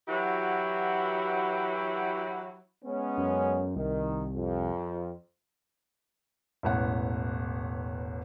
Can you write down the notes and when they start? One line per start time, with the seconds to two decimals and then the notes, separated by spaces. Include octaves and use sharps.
0.08 E3 F#3 E4 F#4 G4
2.85 G#3 B3 C#4
3.18 F#2
3.76 C2 D#3
4.33 F2
6.63 E1 A1 F#5